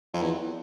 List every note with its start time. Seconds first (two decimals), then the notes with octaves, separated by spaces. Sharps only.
0.14 F2
0.22 E2